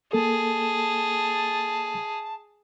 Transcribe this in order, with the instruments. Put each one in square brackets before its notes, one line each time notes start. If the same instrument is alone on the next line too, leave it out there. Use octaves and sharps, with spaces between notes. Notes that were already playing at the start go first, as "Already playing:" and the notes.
[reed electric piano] A#3 A4 [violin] G#4 [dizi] A5